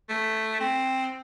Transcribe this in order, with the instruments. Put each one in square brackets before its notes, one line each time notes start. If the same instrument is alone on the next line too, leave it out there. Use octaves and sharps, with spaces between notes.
[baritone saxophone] A3
C4